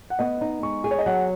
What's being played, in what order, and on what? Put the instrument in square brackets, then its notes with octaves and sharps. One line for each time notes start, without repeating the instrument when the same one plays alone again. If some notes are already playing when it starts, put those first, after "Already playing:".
[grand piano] F#5
[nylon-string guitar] B3 [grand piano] D#5
[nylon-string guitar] D#4
[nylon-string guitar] G#3 [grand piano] C#6
[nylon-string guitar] G#4
[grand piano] C#5
D#5
[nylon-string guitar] F#3 [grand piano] F#5